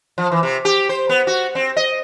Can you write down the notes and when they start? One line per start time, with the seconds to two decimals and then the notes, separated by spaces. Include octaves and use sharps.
0.18 F3
0.32 E3
0.43 C3
0.65 G4
0.89 C5
1.09 B3
1.27 F#4
1.55 C4
1.77 D#5